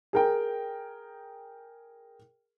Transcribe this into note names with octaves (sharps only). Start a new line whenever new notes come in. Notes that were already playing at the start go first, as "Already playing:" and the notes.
G#4 A#4 G5